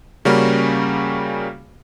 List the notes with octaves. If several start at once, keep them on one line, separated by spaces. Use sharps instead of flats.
C#3 G3 A#3 C#4 F#4